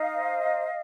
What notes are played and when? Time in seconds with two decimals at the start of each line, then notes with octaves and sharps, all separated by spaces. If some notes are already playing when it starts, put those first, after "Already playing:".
Already playing: D#4 D#5 F5
0.15 C5
0.43 D#4